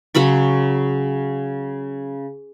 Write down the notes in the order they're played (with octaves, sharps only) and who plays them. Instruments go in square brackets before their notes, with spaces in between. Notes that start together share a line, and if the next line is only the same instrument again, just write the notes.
[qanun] C#3 F#3 B5 C#6